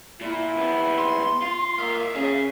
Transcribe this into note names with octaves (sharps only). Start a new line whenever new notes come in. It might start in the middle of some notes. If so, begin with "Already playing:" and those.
A#2 E4
D#2 B3
C6
F4
A#3 E5 F5
C#3 C#4 G#4